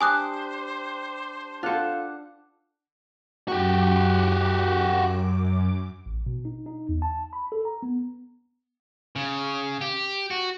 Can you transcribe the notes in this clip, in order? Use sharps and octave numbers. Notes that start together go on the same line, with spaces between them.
D4 G4 C5 G#5 D#6 F#6
D4 F4 A4 F#5
F#2 F#4 G4 D6
A1
B2
D#4
D#4
E2
A5
B5
A4
A#5
B3
C#3
G4
F#4